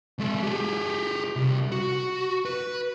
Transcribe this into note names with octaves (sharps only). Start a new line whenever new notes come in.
G#3 A4
G4 G#4
C2
F#4
B4